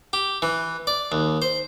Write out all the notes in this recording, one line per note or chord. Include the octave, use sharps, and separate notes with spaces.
G4
E3
D5
D#2
C5